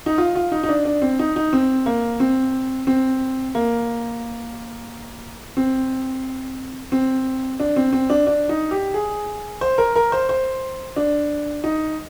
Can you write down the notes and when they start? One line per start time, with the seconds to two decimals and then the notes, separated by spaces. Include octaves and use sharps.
0.06 D#4
0.18 F4
0.35 F4
0.52 D#4
0.63 D#4
0.69 D4
0.85 D4
1.02 C4
1.19 D#4
1.36 D#4
1.53 C4
1.86 A#3
2.20 C4
2.87 C4
3.55 A#3
5.57 C4
6.92 C4
7.60 D4
7.76 C4
7.93 C4
8.10 D4
8.27 D4
8.49 D#4
8.71 G4
8.94 G#4
9.61 C5
9.78 A#4
9.96 A#4
10.12 C5
10.29 C5
10.96 D4
11.64 D#4